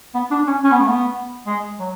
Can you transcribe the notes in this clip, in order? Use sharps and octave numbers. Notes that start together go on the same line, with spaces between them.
B3
D4
C#4
C#4
B3
A3
B3
G#3
F#3